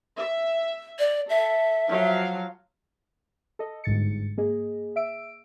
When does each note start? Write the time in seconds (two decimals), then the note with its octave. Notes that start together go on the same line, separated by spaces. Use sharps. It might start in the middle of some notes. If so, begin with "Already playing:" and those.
0.18 E5
0.99 D5
1.29 A4 E5
1.88 F3 F#3 F5
3.59 A4 D#5
3.84 G1 G#2 A6 C#7
4.38 A#3 G#4 D#5
4.96 E5 E6 D7